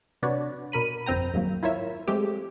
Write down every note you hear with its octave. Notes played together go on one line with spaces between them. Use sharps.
C3 D4 F#4 B4 C#5
B2 A#4 B5 D#7
G1 F2 C4 G5 A#5
D#2 G#2 F#3 A#3
E4 F4 A#4 C#5 E5
G#3 A3 C4 G4